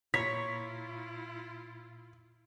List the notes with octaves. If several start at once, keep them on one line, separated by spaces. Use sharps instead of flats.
A#2 E4 F4 C#5 A#5 B5 B6